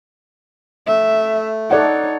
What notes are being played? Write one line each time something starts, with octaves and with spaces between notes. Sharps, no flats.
A3 E5
D#4 A4 C#5 D5 F#5